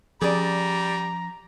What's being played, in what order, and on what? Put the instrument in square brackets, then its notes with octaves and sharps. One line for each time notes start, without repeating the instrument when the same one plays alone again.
[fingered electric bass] F3 C#4 [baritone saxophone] G3 [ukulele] G#4 D5 [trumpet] A#5